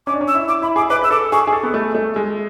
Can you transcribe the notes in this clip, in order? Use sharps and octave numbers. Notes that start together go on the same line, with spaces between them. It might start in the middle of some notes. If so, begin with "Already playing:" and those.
C#4 D6
D4
C#4
E6
E4
E4 D6
E4 B5
G#4 D6
B4 D6
B4 E6
A4 D6
G#4 C#6
G#4
A4
B3
A3
A3
G#3